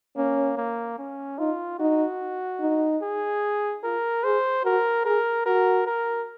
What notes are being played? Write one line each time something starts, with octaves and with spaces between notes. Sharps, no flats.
A#3 C#4
A#3
C#4
D#4 F4
D#4 F#4
D#4
G#4
F4 A#4
G#4 C5
F#4 A#4
G#4 A#4
F#4 A#4
A#4